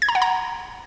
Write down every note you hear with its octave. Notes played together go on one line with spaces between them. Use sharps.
G#6
A#5
F#5
A#5